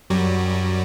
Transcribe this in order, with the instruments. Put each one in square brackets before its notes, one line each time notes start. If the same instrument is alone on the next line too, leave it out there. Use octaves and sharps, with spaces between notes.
[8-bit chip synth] F#2 F#3 G3